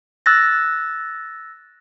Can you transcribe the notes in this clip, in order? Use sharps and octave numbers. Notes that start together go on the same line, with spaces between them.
E6 F#6 A6 A#6